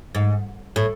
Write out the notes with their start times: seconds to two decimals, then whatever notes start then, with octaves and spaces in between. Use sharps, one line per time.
0.15 G#2
0.76 A2